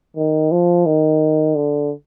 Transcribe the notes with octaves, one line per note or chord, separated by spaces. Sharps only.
D#3
F3
D#3
D3